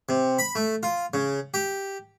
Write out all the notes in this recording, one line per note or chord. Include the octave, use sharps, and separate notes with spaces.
C3
B5
A3
F4
C#3
G4